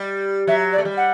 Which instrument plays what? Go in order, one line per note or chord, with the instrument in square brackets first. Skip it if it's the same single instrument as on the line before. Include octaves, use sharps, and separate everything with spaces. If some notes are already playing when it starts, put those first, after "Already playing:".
Already playing: [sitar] G3
[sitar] F#3 [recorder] E5
[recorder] D5
[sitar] A3
G3
[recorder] F#5